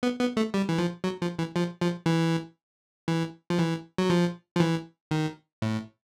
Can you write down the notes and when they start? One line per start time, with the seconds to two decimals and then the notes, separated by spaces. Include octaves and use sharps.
0.03 B3
0.20 B3
0.37 A3
0.54 G3
0.69 E3
0.78 F3
1.04 F#3
1.22 F3
1.39 E3
1.56 F3
1.81 F3
2.06 E3
3.08 E3
3.50 F3
3.59 E3
3.98 F#3
4.10 F3
4.56 F3
4.60 E3
5.11 D#3
5.62 A2